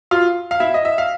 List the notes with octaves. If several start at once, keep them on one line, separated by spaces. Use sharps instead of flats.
F4 F5
F5
E4 E5
D#5
E5
F5